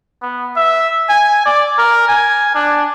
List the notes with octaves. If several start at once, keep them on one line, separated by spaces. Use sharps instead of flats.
B3
E5
G#5
D5
A#4
G#5
D4